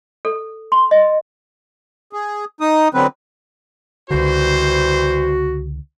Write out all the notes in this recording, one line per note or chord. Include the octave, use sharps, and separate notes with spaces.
A4
C6
D#5
G#4
D#4 D#6
D3 F#3 B3 C4 B4
C#2 D3 E3 G3 F#4 C5